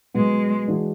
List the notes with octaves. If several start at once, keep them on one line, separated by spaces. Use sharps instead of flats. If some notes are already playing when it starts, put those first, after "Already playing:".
B2 F#3 G#3 B3
E3 G#3 D4 F#4